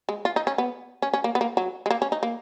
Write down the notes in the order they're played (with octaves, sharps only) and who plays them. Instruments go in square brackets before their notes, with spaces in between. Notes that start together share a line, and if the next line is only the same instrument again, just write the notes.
[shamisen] G#3
F4
D#4
C#4
B3
C#4
C#4
A#3
B3
A#3
F#3
G#3
A#3
C#4
D#4
A#3